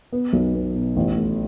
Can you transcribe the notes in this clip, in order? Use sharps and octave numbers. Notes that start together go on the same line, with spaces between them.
B3
B1
B3
B2
A1
A3